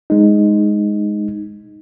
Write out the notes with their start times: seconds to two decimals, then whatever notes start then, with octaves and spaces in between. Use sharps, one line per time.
0.10 G#3 D#4